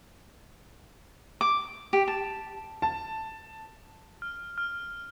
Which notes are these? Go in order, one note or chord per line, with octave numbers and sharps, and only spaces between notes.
D6
G4
A5
A5
F6
F6